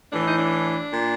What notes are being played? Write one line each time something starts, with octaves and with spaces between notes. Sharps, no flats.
A2 E3 D4
D#4
D4
A#2